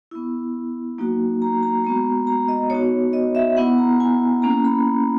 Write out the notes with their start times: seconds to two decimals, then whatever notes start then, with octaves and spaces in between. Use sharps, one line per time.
0.11 B3 E4
0.98 F#3 A#3 D#4 F#4
1.42 A#5
1.63 A#5
1.84 G#3 B3 F#4 A#5
2.27 A#5
2.48 D#5
2.70 B3 D#4 F#4 C#5
3.13 D#5
3.35 E5
3.57 B3 E4 F#5
3.78 A#5
4.00 G#5
4.42 A#3 C#4 E4 A#5
4.65 B5